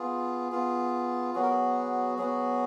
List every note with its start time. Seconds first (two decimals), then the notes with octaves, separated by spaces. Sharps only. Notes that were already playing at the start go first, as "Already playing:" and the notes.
Already playing: B3 F4 G#4
0.52 B3 F4
1.35 F#3 B3 F#4 G#4
1.42 A#4
1.50 G#4
2.18 F#3 B3 F#4 G#4